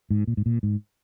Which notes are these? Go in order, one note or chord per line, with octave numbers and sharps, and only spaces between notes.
G#2
A#2
G#2
A#2
G#2